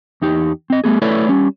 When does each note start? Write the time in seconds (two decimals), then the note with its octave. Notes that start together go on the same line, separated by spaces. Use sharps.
0.22 E2 D#4 G4
0.70 C4 D#5
0.84 G3 A3 B3 G#4
1.02 A3 E4 A4 B4 C#5 D5
1.29 G3 C#4